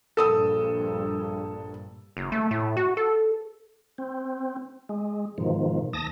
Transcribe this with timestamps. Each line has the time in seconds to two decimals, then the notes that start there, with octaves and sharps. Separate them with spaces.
0.17 A#1 G2 A4 D#6 E6
2.17 F#1
2.32 A3
2.51 A2
2.77 F#4
2.97 A4
3.98 C4
4.89 G#3
5.38 G#2 B2 D#3 F3
5.93 D#2 A5 D#6 A#6